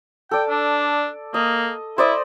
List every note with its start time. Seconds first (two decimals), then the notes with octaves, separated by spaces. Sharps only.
0.31 A4 D5 G5
0.49 D4
1.34 A#3 D#5
1.98 E4 C5 D5 D#5